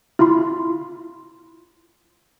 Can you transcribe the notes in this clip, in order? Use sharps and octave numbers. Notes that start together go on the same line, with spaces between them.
E4 F4 B5 C6